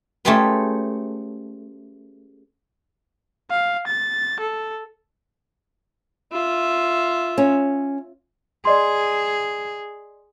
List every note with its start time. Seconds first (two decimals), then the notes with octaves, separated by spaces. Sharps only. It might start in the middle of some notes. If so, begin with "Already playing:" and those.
0.25 A3 C#4 F4 G4 G#4 B4
3.51 F5
3.88 A6
4.40 A4
6.32 F4 E5
7.38 C#4
8.65 G#4 D5 D#5 C6